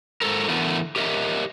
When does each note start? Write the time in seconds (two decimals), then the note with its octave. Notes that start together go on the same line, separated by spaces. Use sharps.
0.22 G#2 F3 A4 A#4
0.49 D3 E3 A3 B3 A#4
0.96 G4 A#4 D#5 E5